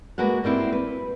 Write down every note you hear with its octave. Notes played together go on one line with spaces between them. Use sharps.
G#3 A#3 F#4 B4 F#5
G3 A#3 C4 E4
B4